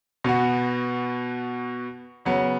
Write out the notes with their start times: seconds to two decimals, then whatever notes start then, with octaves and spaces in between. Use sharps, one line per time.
0.24 B2 B3 F#4
2.25 C#3 F#3 B3